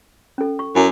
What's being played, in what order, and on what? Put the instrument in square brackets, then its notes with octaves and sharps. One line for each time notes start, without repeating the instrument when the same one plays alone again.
[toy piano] C#4 A4
C#6
[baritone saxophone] F#2 [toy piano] E4 G#5 D6